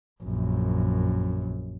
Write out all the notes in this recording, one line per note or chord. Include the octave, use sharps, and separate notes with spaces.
A#1 F#2